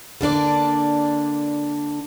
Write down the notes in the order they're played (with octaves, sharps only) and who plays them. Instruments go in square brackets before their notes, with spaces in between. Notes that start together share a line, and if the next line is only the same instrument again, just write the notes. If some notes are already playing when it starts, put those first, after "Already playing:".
[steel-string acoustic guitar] D3 A#3 D4 D5